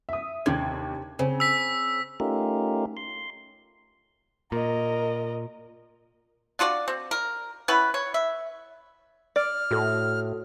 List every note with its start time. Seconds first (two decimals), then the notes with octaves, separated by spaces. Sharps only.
0.09 E5 D#6
0.46 D#2 C3 D4 G#6
1.19 C#3 C4
1.40 E6 B6
2.20 A3 C#4 D#4 F4 G4 A#4
2.97 C6
4.52 A#2 A#4 D#5
6.59 D4 F4 F#4 D5
6.88 C4
7.11 A#4
7.68 B3 C#4 E4 B4
7.94 C#5
8.14 E5
9.36 D5 F6
9.71 A2 F#4 A4